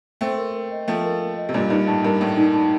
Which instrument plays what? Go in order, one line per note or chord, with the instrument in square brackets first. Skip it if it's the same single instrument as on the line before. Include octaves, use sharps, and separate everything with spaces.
[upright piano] A3 C4 [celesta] G5
[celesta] A#4
A#4
D#5
[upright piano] F3 A3 [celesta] G5
[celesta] A#4
A#4
D#5
[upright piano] C3
[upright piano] G2 A#2 [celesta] D5
[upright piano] G2 [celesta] D#4
[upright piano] A2 [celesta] A5
[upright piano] G2 [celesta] A#4
[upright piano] A2 [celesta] D5
[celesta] D#4
A5